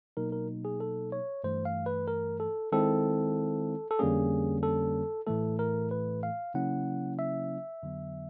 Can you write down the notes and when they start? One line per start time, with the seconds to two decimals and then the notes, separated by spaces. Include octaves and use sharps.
0.17 B2 F#3 A#3 D#4 A#4
0.32 A#4
0.65 G#4
0.80 A4
1.12 C#5
1.44 G2 E3 A3 C5
1.65 F5
1.86 B4
2.08 A#4
2.40 A4
2.72 D#3 G#3 C4 E4 A4
3.91 A4
3.99 F2 D3 G3 A#3 C#4 G#4
4.63 A4
5.27 A2 E3 A3 A4
5.59 A#4
5.91 B4
6.23 F5
6.54 C#3 F#3 A#3 C#4 E4 F#5
7.19 E5
7.83 F2 D3 F#3 B3